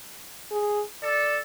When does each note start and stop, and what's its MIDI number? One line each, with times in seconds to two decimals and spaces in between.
0.51 0.83 68
1.03 1.41 69
1.03 1.40 74